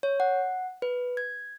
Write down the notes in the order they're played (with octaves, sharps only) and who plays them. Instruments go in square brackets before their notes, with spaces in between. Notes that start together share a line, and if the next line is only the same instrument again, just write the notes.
[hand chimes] C#5
F#5
B4
G#6